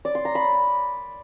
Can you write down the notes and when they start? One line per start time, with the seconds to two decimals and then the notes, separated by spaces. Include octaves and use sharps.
0.05 D5
0.15 C6
0.25 A#5
0.35 B5